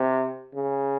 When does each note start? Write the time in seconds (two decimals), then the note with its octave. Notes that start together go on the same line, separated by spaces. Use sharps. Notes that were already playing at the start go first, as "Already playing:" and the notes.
Already playing: C3
0.54 C#3